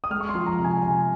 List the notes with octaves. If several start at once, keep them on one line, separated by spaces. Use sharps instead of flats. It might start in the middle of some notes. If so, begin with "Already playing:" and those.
D#6
G#3 F6
C#6
C6
F3
A#5
C3
G#5
C3 G#5